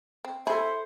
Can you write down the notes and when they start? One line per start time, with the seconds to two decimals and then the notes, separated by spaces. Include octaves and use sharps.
0.25 C4
0.47 E4 A4 C5 E5 G#5